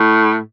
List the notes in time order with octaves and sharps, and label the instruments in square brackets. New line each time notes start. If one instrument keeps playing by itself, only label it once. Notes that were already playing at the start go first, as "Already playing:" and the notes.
Already playing: [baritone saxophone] A2